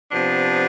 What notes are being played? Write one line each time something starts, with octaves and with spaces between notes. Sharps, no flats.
C3 F3 B3 D4